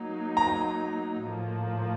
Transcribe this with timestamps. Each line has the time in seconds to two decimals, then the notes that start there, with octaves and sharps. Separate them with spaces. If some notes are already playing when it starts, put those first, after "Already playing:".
Already playing: F#3 A#3 D#4
0.37 A#5
1.23 A2 F3 A#3